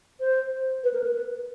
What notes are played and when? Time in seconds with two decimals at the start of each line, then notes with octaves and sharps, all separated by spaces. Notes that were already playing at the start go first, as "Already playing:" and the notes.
0.20 C5
0.84 B4
0.94 A#4
1.04 B4
1.14 B4